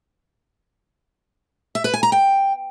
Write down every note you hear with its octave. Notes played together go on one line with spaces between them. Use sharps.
E5
B4
G#5
A#5
G5